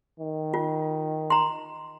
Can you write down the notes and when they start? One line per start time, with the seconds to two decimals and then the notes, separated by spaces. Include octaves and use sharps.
0.20 D#3
0.54 F4
1.30 A#5 C6